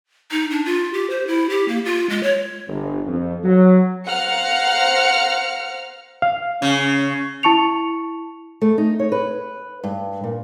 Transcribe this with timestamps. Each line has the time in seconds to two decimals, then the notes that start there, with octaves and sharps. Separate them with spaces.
0.32 D#4
0.51 D4
0.66 F4
0.93 G4
1.10 C5
1.27 E4
1.50 G4
1.68 A#3
1.85 F4
2.10 G#3
2.23 C#5
2.68 G1
3.07 F2
3.44 F#3
4.06 C5 F5 F#5 A#5 F6 C#7
6.22 F5
6.62 C#3 C#4
7.43 E4 A5 C#6 C#7 F7
8.61 A3
8.78 D#4
9.00 C#5
9.12 B4
9.84 G2
10.24 A#2